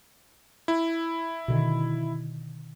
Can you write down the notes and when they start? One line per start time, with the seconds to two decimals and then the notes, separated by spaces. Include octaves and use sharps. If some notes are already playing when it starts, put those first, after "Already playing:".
0.68 E4
1.48 B2 D3 D#3